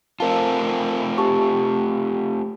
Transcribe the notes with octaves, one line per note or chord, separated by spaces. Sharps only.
A3 C4 F4 A#4 A5
G4 A5 C#6